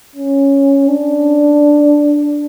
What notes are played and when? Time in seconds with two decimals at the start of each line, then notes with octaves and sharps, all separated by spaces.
0.15 C#4
0.88 D4